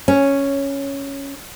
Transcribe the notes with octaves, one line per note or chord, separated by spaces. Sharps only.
C#4